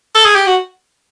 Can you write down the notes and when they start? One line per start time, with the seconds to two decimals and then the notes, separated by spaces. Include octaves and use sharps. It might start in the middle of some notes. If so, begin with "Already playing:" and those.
0.15 A4
0.25 G#4
0.36 G4
0.47 F#4